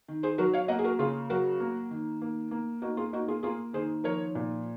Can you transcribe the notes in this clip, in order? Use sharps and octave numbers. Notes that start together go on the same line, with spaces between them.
D#3
G#4 C5
F#3 F#4 A#4
C#5 F5
A#3 D#5 F#5
G#4
F#4 A#4
C#3 F4 G#4
F#3 F#4 A#4
A#3
D#3
A#3
A#3
A#3 D#4 F#4
F4 G#4
A#3 D#4 F#4
F4 G#4
A#3 F4 G#4
D#3 G#4 C5
F3 A#4 C#5
A#2